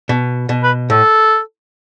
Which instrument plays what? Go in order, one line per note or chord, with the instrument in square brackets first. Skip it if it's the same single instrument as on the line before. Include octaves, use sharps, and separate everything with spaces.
[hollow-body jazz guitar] B2
B2
[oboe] B4
[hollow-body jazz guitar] A2 [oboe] A4